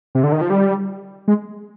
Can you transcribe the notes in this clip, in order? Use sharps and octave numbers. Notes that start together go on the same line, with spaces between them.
C3
D3
D#3
F3
G3
G#3